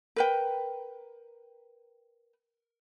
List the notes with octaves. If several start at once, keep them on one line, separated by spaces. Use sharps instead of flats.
A#4 B4 G5